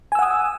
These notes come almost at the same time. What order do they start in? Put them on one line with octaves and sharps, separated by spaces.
G#5 E6 F#5 D#6